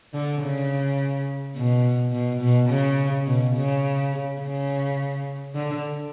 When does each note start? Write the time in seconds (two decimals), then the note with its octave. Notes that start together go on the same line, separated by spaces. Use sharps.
0.13 D3
0.42 C#3
1.56 B2
2.12 B2
2.41 B2
2.69 C#3
3.27 B2
3.56 C#3
4.41 C#3
5.55 D3